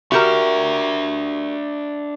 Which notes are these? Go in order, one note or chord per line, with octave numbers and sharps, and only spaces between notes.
D4 F#4 G4 A#4 E5